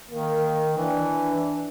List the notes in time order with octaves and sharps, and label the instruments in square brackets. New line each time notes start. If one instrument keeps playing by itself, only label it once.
[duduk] D#3 [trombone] A#3
[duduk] E3 [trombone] D4